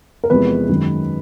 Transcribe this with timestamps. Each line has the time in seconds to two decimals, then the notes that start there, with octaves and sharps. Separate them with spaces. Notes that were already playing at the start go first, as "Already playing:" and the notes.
0.24 A#4
0.30 E2 C3 F3 G#3 B4
0.69 F#2 D#3 G#3